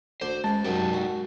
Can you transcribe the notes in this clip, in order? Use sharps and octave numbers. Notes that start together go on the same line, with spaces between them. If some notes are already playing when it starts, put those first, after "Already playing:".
D2 D3 C5 D5
C#2 C#3 G#3 A5
F#2 F#3 G#3 D#4 G4
F#4